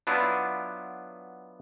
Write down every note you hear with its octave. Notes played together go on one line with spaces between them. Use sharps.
F#3 B3 D4 E4 F4